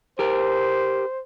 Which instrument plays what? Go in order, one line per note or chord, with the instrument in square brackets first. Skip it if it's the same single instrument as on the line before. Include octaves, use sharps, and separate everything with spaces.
[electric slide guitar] G4 A#4 [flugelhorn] C5